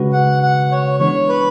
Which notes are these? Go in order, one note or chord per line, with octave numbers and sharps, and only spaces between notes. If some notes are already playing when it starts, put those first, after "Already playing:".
Already playing: C#3 G#3 C#4 F#4 B4
F#5
F#5
C#5
E3 G#3 B3 D4 C#5
B4